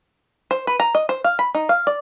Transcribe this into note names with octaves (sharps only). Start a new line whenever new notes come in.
C5
B4
A#5
D#5
C5
F5
B5
D#4
F5
D5